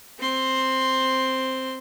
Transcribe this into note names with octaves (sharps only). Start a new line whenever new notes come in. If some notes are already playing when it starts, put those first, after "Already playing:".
C4 C6